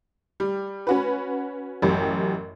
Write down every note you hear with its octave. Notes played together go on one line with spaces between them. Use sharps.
G3
C#4 F#4 B4
A1 F#2 G4